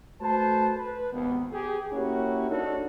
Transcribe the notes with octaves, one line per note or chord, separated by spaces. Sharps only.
A3 F#4 B4 C5 A5
B4
G#1 D#2 B3
G4 G#4
A#3 C#4 E4 F#4 G4 A#4
D4 D#4 F#4 A4 C#5 D5